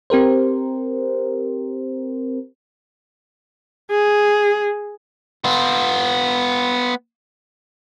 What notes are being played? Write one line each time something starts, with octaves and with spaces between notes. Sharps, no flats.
C4 G4 A#4 C5
G#4
B3 F4